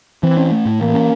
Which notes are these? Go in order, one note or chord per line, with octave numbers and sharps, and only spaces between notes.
E3 C4
C#4
A3
A2
E3 A#3
C#4